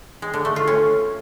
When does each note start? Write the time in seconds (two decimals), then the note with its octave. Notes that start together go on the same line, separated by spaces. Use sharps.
0.22 G#3
0.34 D3
0.45 A3
0.56 F4
0.68 C#4